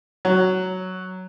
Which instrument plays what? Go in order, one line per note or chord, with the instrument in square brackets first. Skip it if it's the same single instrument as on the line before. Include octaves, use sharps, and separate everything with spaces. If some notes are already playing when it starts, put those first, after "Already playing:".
[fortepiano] F#3